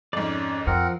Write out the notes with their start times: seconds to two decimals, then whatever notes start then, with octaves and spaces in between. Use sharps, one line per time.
0.13 F2 G#2 C#4 D5
0.67 F2 F3 C4 A#4 F#5